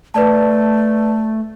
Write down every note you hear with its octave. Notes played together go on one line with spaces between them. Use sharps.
A3 B4 D5 A5